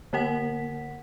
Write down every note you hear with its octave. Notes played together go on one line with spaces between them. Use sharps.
D3 A#3 A#4 F#5 B6